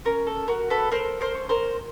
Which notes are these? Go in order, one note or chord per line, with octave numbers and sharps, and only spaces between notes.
C#4 A#4
A4
F#4 A#4
A4 B4
A4 A#4 C5
A#4 C5
C#4
A#4 C5